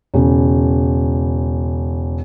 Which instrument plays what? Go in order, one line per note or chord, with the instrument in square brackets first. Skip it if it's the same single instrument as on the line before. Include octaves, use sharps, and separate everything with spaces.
[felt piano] E1 C#3